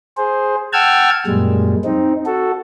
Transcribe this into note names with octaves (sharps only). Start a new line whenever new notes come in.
G#4 C5
F#5 G5 A5 E6 F6 G#6
F#2 A#2 G3 G#3
C4 D#4
F#4 A4